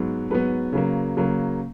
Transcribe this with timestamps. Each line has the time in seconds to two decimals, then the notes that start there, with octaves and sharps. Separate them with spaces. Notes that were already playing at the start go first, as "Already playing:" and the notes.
Already playing: G#2 F#3 B3
0.30 G#2 F#3 B3 B4
0.73 C#3 F#3 A#3
1.17 C#3 F#3 A#3